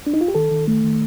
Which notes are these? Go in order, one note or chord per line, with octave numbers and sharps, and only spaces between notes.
D4
D#4
F4
G4
D#3 A4
D#3
A3
D#3